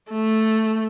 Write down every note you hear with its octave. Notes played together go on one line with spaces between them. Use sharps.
A3